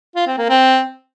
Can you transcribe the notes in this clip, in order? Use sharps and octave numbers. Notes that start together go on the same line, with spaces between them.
F4
C4
A#3
C4